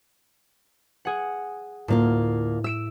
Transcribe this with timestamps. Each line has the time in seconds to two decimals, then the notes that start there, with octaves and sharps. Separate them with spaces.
1.05 G#4 F#5
1.88 D2 A2 A#3 F4
2.64 E5 E6 D7 E7